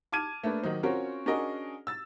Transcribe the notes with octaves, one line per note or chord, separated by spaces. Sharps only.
A5 D6 F6 G#6 D#7
A3 A#3 D4 B4
D#3 F#3 D#4 C5
C4 C#4 F4 F#4 A#4 C#5
C#4 D4 F#4 G#4 A#4 D#5
E6 A6